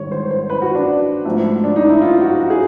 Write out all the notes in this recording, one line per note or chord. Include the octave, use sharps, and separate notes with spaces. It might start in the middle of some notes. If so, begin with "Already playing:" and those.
Already playing: G#2 D#3 G3 C#5
C5
C5
B4
F#4
D4
G#2 F3 A3
D4
D#4
E4
F4
F#4
F#4
G#4